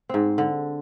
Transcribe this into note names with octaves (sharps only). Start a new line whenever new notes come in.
G#2 C4
D3